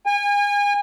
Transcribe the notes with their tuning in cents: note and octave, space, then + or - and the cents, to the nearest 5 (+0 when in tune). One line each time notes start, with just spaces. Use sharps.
G#5 -35